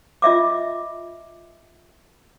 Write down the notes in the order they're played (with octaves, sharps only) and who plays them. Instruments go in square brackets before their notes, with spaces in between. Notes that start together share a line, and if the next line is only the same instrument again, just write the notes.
[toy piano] F4 D#5 E5 D6